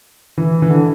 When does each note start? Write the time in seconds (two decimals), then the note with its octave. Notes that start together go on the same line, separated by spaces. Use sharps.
0.37 E3
0.62 E3
0.70 D3